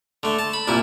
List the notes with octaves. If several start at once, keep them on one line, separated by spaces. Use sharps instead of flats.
D3 A3
A5
B5
C2 A#2 E4